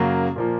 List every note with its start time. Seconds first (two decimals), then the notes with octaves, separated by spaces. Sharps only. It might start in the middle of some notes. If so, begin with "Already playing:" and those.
Already playing: F#2 C#3 F#3 A#3
0.36 A#2 F3 A#3